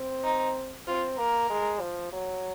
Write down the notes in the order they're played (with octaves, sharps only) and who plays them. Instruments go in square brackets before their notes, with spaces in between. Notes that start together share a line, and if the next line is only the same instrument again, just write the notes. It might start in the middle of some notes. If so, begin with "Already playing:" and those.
Already playing: [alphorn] C4
[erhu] D#4
[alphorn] C4 [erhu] F4
[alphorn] A#3 [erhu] A#4
[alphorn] G#3
F3
F#3